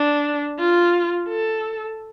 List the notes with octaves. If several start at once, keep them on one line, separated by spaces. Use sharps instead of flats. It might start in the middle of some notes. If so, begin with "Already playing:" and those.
Already playing: D4
F4
A4